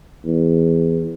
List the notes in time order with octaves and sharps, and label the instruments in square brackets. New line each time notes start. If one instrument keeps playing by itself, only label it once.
[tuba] E2